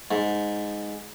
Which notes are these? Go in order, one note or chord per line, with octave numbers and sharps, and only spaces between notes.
G#2